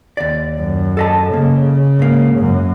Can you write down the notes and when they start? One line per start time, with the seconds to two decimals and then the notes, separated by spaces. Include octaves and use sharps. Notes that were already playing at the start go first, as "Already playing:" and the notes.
0.17 D#2 D5
0.60 F#2
0.97 A4 D#5 A5
1.34 C#3 A#3
1.99 G#2 A#3
2.39 F#2